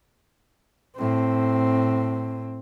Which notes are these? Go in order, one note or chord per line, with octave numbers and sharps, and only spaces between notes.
A2 C4